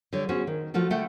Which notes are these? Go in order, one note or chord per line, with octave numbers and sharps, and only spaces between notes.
D3 G3 C#5
B3 C#4 F#4 G#4 C5
D#3
F3 A3 F4 F#4 A4
D3 A3 F#5 G5